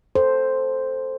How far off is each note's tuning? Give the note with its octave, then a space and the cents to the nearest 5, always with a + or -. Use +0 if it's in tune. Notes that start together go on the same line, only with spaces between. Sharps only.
A4 +0 C5 +0